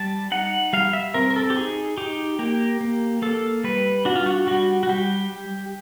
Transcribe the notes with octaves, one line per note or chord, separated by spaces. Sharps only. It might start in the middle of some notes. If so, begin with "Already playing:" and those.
Already playing: G3 A5
D#4 F#5
G3 F5
E5
C4 A#4
A#4
A4
G4
D#4 G#4
D#4 G4
A#3 G4
A#3
A#3 A4
G3 B4
D4 F#4
F4
F#4
G3 F#4
F#4
G3 G4